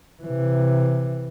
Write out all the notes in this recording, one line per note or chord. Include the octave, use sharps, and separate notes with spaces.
C3 E3